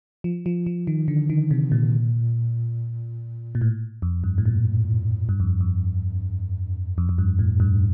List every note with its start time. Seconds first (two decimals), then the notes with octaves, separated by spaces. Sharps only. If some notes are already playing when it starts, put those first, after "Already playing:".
0.24 F3
0.46 F3
0.66 F3
0.87 D#3
1.08 D3
1.30 D#3
1.51 C3
1.72 A#2
3.55 A#2
3.61 A2
4.02 F2
4.24 G2
4.38 A2
4.46 A#2
5.29 G2
5.40 F2
5.60 F2
6.98 F2
7.09 F2
7.18 G2
7.39 A2
7.60 G2